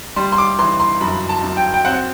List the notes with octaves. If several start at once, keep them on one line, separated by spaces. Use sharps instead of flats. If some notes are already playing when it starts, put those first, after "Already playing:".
G3 C6
C6
D6
E3 C6
C6
F#2 B5
A5
F#2
G5
G5
C4 F#5